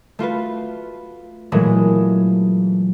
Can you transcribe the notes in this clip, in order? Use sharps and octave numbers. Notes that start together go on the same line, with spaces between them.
A3 F4 F#4 B4
A#2 E3 F#3 G#3 A3